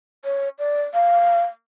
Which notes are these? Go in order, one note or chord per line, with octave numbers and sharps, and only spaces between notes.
C#5
D5
F5